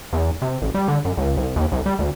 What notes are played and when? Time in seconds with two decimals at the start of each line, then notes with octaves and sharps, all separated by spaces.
0.13 E2
0.42 C3
0.62 A1
0.74 G3
0.88 D3
1.05 F#2
1.17 C#2
1.37 C2
1.56 D#2
1.72 C2
1.86 G3
1.99 D2